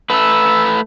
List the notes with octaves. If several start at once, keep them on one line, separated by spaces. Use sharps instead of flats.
A3 B4 E6